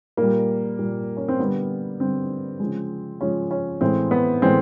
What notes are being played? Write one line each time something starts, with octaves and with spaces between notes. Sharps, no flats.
A#2 G3 A#3
A#2 G3
C#4
C4
D3 G3 B3
D3 G3 C4
C#3 F3 G#3
C#3 F3 G#3 C#4
C#4
A2 E3 G#3 C4
B3
A2 E3 G#3 C4